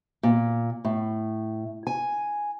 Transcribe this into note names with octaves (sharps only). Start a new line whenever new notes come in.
A#2
A2
G#5